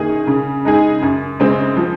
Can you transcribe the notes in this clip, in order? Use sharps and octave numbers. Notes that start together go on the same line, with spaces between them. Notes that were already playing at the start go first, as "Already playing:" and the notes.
Already playing: F#2 D#3 A#3 D#4 G#4
C#3
G#3 D#4 G#4
F#2
C#3 G#3 C4
F3